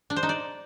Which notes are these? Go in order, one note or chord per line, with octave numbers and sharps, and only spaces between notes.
D4
C5
D#4
D5